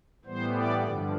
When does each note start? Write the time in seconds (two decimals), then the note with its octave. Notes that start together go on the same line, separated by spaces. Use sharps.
0.25 A2 E3 G3 B3 C5
0.54 D5
0.84 G2 D3 F3